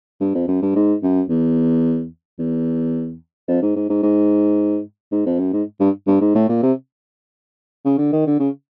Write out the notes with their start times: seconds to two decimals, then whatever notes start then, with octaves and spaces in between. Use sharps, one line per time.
0.21 G2
0.35 F2
0.48 F#2
0.62 G2
0.75 G#2
1.03 F#2
1.29 E2
2.39 E2
3.48 F2
3.62 G#2
3.76 G#2
3.89 G#2
4.03 G#2
5.12 G#2
5.26 F2
5.39 F#2
5.53 G#2
5.80 G2
6.07 G2
6.21 G#2
6.35 A2
6.49 A#2
6.63 C3
7.85 C#3
7.98 D3
8.13 D#3
8.27 D3
8.39 C#3